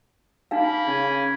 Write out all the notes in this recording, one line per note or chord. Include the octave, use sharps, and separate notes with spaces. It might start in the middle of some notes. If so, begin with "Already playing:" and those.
A#3 D4 D#4 F5 B5
C#3 G#5